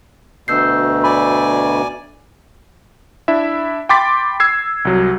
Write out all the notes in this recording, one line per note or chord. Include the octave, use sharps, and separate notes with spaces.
D2 B2 E6 G6 C7
D5 G#5 B5
D4 E4 E5
G5 B5 C6 D6 A6 B6
E6 G#6 C7
C2 F#3